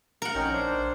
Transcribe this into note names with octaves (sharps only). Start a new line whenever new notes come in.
A#4 F#5
A#1 C#4 D#4 G5
D4 C5